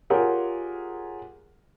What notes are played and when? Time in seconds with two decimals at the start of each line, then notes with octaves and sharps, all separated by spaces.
0.10 F4 G4 G#4 A#4 C#5 F#5